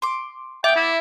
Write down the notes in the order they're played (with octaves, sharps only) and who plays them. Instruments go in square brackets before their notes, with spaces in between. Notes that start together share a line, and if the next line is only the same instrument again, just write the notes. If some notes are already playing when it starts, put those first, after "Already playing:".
[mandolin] C6 D6
[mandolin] B3 D6 [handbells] E5 [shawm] G5
[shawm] E4